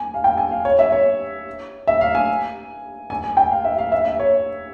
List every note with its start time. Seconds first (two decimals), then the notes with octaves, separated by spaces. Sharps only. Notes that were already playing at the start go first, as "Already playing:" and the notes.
Already playing: G#5
0.14 F5
0.24 G5
0.38 G#5
0.51 F5
0.65 C#5
0.79 E5
0.92 C#5
1.87 E5
2.01 F5
2.15 G#5
3.10 G#5
3.24 G#5
3.37 G5
3.51 F5
3.65 E5
3.78 F5
3.92 E5
4.05 E5
4.20 C#5